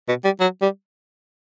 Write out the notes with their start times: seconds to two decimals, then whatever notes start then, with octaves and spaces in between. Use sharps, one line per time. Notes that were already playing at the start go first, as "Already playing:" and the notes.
0.09 B2
0.25 G3
0.41 F#3
0.62 G3